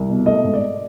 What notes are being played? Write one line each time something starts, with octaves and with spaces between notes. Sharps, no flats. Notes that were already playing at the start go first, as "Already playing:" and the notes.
Already playing: C2
B2
A3 D#5
G#2
D5